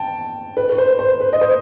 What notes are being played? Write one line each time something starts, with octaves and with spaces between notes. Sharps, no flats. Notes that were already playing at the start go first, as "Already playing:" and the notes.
Already playing: G5 A5
B4
B4
C5
C5
B4
D#5
C5